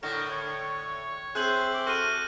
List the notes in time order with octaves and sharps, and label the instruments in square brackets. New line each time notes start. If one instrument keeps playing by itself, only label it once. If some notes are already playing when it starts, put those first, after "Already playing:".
[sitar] A2 D3 [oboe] A#4 [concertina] C#6
[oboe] C#5
[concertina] C4 E5 C6 [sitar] G#4 [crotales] F#6 G6 F#7
[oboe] D6
[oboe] F#4 [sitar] A4 [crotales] C#6 F6 D#7